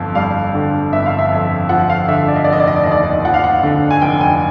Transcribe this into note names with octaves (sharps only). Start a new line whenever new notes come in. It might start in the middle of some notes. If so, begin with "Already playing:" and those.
Already playing: G1 F2 F5 A5
G3 F5
D3
G1 E5
F5
E5
F2
F3 F#5
F5
D3 E5
D5
D#5
F1 D5
D#5
D5
D#5
D5
D#2 D#5
D5
F3 F#5
F5
F#5
D3
G#5
F1 G5
G#5